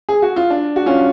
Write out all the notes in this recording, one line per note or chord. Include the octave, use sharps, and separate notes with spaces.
G#4
F#4
F4
D4
F#4
C#4 F4